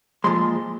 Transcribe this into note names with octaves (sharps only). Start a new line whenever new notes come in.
A#2 F3 G#3 C6